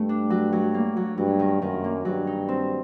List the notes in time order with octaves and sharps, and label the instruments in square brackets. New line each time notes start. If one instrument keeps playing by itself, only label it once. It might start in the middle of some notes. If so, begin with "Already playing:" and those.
Already playing: [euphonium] G2 [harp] A3
[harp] D4
F#3
F#3
A#3
F#3
[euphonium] G2 [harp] F#3
[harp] D#3
[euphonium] F#2 [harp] D#3
[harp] A#3
[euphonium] G2 [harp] F#3
[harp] D#4
C4